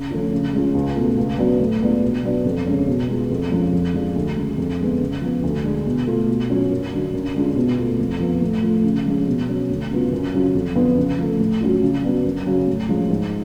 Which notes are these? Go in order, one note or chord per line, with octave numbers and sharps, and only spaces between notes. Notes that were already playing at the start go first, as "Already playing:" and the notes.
Already playing: C#3
F3 A3 C#4 F4
C#3
G#3 C#4 F4
C#2
B2 A3 F4
C#2
C#3 F#3 B3 D4
A2
G#3 B3 D4 F4
B2
F#3 B3 D4
F2
C#3 G#3 C#4
B2
G#3 B3 F4
F2
F3 G#3 C#4
F2
F3 G#3 D4 F4
D2
C#3 G#3
F2
D3 G#3 B3
C#3
F3 B3
D2
D3 G#3
B2
A3 F4
B2
F#3 C#4 F4
F#2
D3 F#3
F#2
D3 G#3 C#4 F4
B2
A3 F4
F2
F3 B3 F4
A2
F3 A3 F4
C#3
F3 G#3 C#4
B2
F#3 C#4
D2
C#3 F#3 B3 F4
F#2
C#3 F#3 C#4 F4
F2
D3 F3 B3 F4
C#3
F3 A3
A2
F#3 C#4 F4
C#3
F#3 B3 D4
F#2
C#3 F#3 C#4
A2
F3 G#3 C#4
G#2